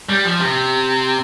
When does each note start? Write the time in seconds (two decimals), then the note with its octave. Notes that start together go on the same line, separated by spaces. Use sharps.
0.09 G3
0.25 F3
0.40 C3